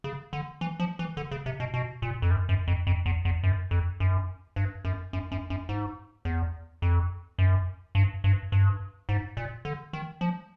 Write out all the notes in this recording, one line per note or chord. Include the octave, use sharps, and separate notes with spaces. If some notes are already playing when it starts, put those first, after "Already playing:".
C#3
D3
E3
F3
E3
D3
C#3
C3
B2
B2
A#2
F2
F#2
F#2
F2
F2
E2
E2
F#2
F2
F#2
G2
F#2
F#2
F#2
F#2
G#2
E2
F2
F#2
G2
G2
G2
G#2
A#2
D3
D#3
F3